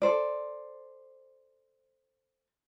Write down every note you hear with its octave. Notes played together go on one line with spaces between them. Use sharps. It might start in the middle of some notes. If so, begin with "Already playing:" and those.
A4 C5 D5